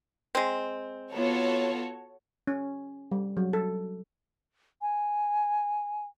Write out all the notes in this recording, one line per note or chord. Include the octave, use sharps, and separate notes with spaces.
G#3 C4
B3 F4 F#4 A4 C#5
C#4
G3
F#3
A4
G#5